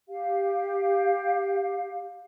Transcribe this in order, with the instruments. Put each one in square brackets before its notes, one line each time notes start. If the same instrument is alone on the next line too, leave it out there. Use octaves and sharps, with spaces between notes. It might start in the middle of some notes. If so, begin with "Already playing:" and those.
[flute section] G4 F5